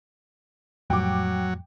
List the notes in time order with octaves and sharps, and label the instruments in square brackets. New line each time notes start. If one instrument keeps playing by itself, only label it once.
[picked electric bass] F2 A2 G3 [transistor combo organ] F#3 [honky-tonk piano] G5 D6